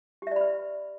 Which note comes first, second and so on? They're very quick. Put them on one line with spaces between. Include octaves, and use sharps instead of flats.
G4 E5 D5 B5 B4